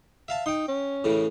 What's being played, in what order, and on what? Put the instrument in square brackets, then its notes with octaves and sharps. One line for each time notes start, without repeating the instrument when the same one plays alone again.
[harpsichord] E5 F5 A5
[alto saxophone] D#4 [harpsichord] G5 C6
[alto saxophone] C#4
[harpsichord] A2 C#3 E3